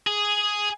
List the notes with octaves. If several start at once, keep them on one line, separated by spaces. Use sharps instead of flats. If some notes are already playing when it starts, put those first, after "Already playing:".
G#4